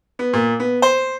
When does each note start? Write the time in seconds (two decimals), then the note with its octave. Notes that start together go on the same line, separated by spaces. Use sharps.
0.19 B3
0.33 A#2
0.60 B3
0.82 C5